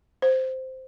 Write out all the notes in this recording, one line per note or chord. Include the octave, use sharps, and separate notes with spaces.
C5